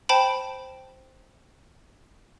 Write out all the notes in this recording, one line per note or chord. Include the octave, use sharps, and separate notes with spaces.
C5 G5 A5 B5